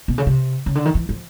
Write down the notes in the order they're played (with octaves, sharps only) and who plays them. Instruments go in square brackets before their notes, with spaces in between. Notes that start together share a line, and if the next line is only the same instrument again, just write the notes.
[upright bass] B2
C#3
C3
C#3
D3
D#3
E3
F3